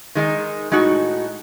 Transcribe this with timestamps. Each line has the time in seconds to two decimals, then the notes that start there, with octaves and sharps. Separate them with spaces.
0.15 D#3 G#3 D#4
0.72 A2 G#3 D#4 F#4